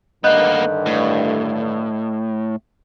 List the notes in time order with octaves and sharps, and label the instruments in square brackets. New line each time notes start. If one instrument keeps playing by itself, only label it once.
[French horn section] G2 D3 D#3 [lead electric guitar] A#3 B3 [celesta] D#5 F#6 G6
[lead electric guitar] A2